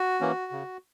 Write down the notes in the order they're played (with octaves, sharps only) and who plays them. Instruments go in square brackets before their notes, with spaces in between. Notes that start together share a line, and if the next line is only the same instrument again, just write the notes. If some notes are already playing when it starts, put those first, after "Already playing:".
Already playing: [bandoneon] F#4
E3 A#3 C#4
C#3